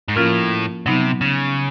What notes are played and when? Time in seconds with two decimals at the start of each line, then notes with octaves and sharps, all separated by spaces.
0.09 G#2
0.16 A2 F3 A#3 C#4 F4 A#4
0.86 C3 F#3 B3 D#4
1.21 C#3